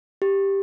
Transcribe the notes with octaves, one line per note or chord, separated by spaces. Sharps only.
G4